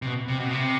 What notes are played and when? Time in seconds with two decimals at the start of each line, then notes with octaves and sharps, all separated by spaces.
0.02 C3
0.06 B2
0.28 C3
0.40 B2
0.51 C3